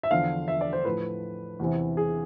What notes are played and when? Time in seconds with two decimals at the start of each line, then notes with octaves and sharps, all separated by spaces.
0.03 E5
0.11 E2 D3 F3 F5
0.48 E5
0.61 D5
0.73 C5
0.85 A2 F3 B4
1.59 E2 C3 E3
1.97 G#4